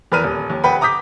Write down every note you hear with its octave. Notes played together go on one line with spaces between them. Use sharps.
E2 A#4 B4 F6 D#7
D#1
D#2
D#1 B4 F#5 G5 B5
A#5 D6 D#6 G6 B6